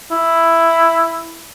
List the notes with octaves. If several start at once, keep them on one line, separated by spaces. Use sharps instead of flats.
E4